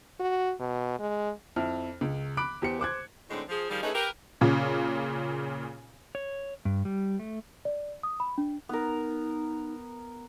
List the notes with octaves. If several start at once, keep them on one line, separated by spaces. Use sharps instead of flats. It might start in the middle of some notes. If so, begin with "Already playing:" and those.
F#4
B2
G#3
F2 E4 F6
C#2
B5 D6 F#6 D7
E2 G4 C5 C#7
C5 D6 F#6 G#6
A2 D3 G#3 C4 D4 D#4
F3 G#4
D#3 F3 G3 F4 G4 G#4
A3 C#4 D#4 E4 G#4 B4
G4 A#4 B4
A#2 C#3
C#5
G2
G3
A3
D5
D#6
B5
D4
B3 D#4 A#4